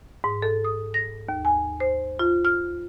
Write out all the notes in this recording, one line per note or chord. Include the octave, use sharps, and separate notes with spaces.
G#2
A4
D#6
A#6
D#2
G#5
C5
F4
F6